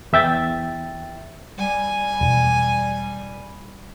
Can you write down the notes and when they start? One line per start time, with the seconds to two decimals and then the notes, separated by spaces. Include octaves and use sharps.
0.13 E2 E5 G5 A6
1.58 G3 G#5
2.21 E1